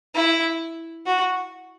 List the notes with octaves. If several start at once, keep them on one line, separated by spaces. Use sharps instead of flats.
E4
F#4